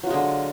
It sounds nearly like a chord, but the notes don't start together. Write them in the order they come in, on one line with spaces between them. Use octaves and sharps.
F#3 F4 G#3 D3